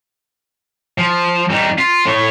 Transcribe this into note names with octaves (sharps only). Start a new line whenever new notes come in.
F3
G3 D#4
F4
A2 C#5